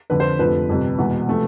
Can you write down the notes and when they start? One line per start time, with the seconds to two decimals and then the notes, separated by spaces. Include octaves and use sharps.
0.10 F2 D3 F3 B4
0.20 C5
0.39 F1 F2 D3 F3 B4
0.69 G1 F2 C3
0.98 E1 E2 B2 B3
1.27 C3 F3 A3